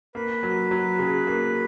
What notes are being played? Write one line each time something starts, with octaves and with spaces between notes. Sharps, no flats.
A#3 B4
F#3
F#3
C#3
A#3